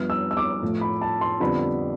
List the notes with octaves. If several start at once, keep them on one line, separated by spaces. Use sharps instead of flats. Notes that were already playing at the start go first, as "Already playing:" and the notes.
Already playing: G2 F3 B3 F6
E6
E6
D6
A2 F3 A3
B5
A5
C6
F2 D3 G3 B3 B5